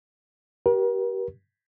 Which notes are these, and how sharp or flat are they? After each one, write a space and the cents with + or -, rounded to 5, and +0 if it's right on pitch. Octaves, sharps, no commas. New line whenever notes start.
G4 -25 A#4 +40